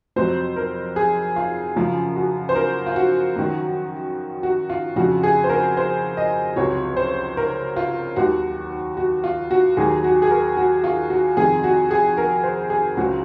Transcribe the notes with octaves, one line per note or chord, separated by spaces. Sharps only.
F2 C3 F#3 C5
A#4
G#4
F4
F#2 C#3 F3 F4
F#4
C5
A#4
F4
F#4
F#2 D#3 F#3
F#4
F4
F2 C#3 F3 F#4
G#4
C5
A#4
C5
D#5
C#2 C3 F#3 C#5
C5
A#4
F4
D#2 D#3 F#3 F#4
F#4
F4
F#4
D#2 D#3 F#3 G#4
F#4
G#4
A#4
F#4
F4
F#4
F2 C3 D#3 G#4
F#4
G#4
A#4
C5
G#4
C#2 C#3 F#3 F#4